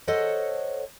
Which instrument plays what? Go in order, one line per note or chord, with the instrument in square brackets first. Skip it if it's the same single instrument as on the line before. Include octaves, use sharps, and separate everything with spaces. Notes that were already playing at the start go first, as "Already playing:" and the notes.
[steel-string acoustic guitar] A4 C5 C#5 D#5 F#5